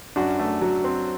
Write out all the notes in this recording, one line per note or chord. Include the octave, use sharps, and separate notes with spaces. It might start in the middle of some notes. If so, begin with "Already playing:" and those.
F#2 D4 F#4
A3
F#3
C4